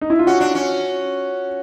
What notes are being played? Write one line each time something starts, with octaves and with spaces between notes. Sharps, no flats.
D#4
E4
F4
C#4 F#4
D4
C#4